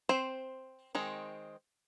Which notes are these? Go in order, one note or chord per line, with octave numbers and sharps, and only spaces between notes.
C4 C5
D#3 G#3 C4 D#4